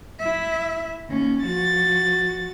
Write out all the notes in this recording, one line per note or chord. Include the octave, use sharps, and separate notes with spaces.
E4 E5
D#2 C#4
F3 F#4 A6